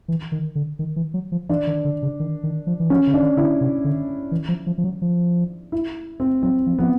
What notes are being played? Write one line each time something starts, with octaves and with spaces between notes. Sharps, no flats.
E3
D#3
D3
D#3
E3
F#3
F3
E3 D4
D#3
D3
C#3
D#3
D#3
F3
E3
F3 C#4
D3
D#3 D4
D3 E4
C3
D3
E3
F3
F3
F3
F#3
F3
E4
C4
F#3 C4
F3
F3 B3